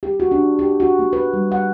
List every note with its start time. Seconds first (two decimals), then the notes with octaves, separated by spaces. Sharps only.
0.03 G4
0.20 F#4
0.31 D4
0.59 G4
0.80 F#4
0.99 A#3
1.13 B4
1.33 G3
1.52 F#5